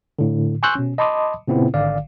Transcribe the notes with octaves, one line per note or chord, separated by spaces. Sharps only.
A2 D3
G#5 C6 C#6 E6 F#6 G6
B2 C#4
D#5 A5 B5 C6 D6 D#6
A#2 C#3 B3 C4 E4
G#1 D3 D5 F5